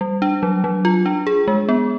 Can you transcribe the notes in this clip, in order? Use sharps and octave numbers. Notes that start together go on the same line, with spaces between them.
G3
D4
F#3
F#3
F4
D4
G#4
G#3
B3